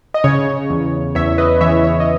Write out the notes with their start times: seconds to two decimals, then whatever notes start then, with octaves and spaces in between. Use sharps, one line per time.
0.14 D#5
0.24 C#3 C#5
0.70 E2
1.15 E2 C#5 E5
1.38 B4 D#5
1.61 E3 C#5 E5
1.84 C#5 E5
2.00 D#5